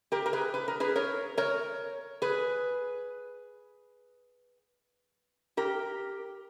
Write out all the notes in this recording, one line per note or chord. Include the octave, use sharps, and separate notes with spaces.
G4 A#4
A#4
G#4 B4
B4
A#4
G#4 B4
A#4 C#5
A#4 C#5
G#4 B4
G4 A#4